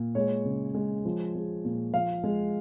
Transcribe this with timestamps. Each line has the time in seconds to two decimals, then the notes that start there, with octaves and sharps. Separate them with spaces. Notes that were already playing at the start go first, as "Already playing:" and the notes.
Already playing: A#2
0.15 G#3 C#5
0.45 C#3
0.75 G#3
1.05 F3
1.35 G#3
1.65 A#2
1.94 F3 F5
2.24 G#3